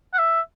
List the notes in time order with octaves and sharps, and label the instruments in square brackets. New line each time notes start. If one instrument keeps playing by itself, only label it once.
[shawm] F#5
E5